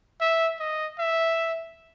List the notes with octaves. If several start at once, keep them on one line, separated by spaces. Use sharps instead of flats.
E5
D#5
E5